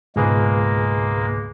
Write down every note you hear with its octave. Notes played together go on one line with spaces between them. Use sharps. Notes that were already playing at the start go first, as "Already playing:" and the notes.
C#2 G#2 B2 G#3 A#3 G#4 B4